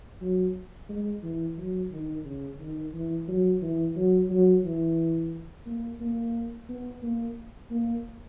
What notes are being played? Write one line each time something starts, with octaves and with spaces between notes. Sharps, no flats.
F#3
G#3
E3
F#3
D#3
C#3
D#3
E3
F#3
E3
F#3
F#3
E3
A#3
A#3
B3
A#3
A#3